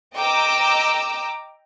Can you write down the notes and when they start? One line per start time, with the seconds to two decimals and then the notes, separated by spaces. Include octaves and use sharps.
0.16 D#5 G5 A#5 D6 E6